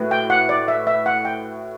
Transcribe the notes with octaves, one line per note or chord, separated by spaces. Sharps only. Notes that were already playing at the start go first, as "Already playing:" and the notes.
Already playing: A2 F#4 B4
G5
F#5
D5
E5
E5
F#5
G5